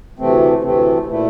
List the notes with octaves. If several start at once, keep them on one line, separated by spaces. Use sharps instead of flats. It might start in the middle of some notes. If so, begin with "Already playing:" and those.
D2 C3 E3 A3 C4
D2 C3 E3 A3 C4
A#2 A3 E4